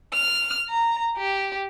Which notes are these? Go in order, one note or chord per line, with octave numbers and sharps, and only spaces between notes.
F6
A#5
G4